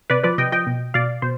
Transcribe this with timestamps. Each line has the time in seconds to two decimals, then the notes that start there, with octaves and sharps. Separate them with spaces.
0.10 C3 B4 D5
0.23 F3 B4 D5
0.38 C3 D#5 G5
0.52 F3 D#5 G5
0.67 B2
0.94 B2 D5 F5
1.22 B2 C5